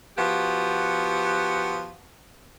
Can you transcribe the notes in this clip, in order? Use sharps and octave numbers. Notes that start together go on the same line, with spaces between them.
F3 B3 F#4 G4